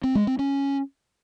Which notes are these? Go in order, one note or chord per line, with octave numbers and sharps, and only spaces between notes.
C4
G#3
C4
C#4